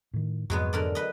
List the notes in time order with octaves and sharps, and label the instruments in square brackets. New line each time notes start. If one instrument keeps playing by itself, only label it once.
[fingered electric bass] A2 D#3
[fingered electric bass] F2 G#2 C3 [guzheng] F#3 G#3 B3
[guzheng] D3 A#4 D5
B4 D#5